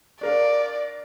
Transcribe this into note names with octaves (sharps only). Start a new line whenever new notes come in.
D4 A#4 D5 F5